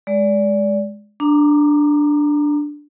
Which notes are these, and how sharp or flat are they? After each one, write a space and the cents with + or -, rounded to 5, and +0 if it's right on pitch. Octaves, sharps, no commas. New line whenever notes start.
G#3 +0 D5 -20
D4 +0 A#5 -5 D6 +45